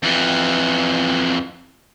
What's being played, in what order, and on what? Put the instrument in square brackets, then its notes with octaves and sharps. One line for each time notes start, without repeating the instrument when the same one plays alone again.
[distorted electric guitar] F2 E3